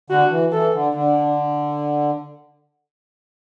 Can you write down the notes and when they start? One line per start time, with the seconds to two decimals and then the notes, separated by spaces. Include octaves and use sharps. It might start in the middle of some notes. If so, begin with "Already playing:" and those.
0.10 D3 F#4
0.31 E3
0.52 E3 A4
0.74 D3
0.94 D3 D4